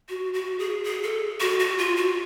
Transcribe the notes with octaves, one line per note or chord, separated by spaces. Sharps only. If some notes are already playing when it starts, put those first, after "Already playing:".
F#4
F#4
G#4
G#4
A4
F#4
F#4
F4
F#4